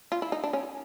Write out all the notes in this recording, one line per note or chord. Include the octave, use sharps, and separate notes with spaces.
F4
E4
D#4
D4
C#4